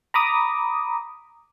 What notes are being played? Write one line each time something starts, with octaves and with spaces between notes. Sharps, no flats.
A#5 B5 D6 D#6